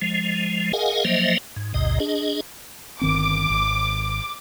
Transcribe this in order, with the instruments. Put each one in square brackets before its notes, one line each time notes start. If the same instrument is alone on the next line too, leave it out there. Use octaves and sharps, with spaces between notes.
[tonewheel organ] F3 G#3
G#4 A#4 D#5 F5 F#5 G#5
F3 F#3 A#3 C5 D#5 E5
G#2
A#1 D#2 G#2 C3 D#5
D4 G#4 D#5
[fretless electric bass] G1 D#3 C4 [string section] D6
[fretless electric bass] G#1